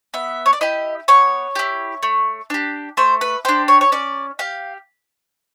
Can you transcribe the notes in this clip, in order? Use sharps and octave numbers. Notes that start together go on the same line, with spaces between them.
B3 E5
C#5
D5
E4 G4 D#5
B3 C#5
E4 G4
A3
D4 G4
A3 C5
B4
D4 G4 C5
C#5
C#5
C#4 D5
G4 F5